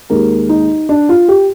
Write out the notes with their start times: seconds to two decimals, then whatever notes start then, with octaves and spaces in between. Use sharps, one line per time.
0.10 D#2 D#3 G#3 A#4
0.49 D#4
0.89 D4
1.09 F4
1.28 G4